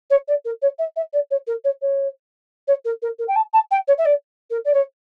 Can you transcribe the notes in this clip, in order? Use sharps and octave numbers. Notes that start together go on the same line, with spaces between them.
C#5
D5
A#4
C#5
E5
E5
D5
C#5
A#4
C#5
C#5
C#5
A#4
A#4
A#4
G5
A5
A5
G5
C#5
E5
D5
A#4
D5
C#5